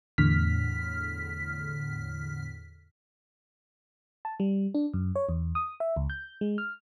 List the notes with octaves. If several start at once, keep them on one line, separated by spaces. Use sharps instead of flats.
E2 A2 D3 F6 B6
A5
G3
D4
F#2
C#5
E2
D#6
E5
C#2
G6
G#3
F6